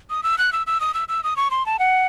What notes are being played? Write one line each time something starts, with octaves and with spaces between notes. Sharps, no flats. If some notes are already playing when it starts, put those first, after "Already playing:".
D#6
E6
F#6
E6
E6
D#6
E6
E6
D#6
C#6
C6
A5
F#5